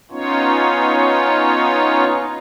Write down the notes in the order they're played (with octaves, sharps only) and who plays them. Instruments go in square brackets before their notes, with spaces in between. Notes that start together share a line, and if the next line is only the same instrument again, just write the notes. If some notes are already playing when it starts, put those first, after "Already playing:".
[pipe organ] B3 C#4 D#4 F4 C#5